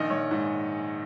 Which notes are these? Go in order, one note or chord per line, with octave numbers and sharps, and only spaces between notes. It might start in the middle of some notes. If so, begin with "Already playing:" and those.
Already playing: A#1 D#3 D#5
A#1 C#5
G#2